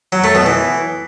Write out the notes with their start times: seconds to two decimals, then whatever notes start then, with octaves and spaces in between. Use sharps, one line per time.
0.12 F#3
0.24 A3
0.35 B2
0.46 E3